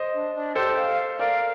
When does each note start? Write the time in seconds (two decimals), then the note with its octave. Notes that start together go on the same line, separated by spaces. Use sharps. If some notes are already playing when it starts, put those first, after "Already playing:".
Already playing: C5 D#5
0.14 D4
0.35 D4
0.55 G4 A4 C5
0.76 F5
1.19 A#4 D5 F5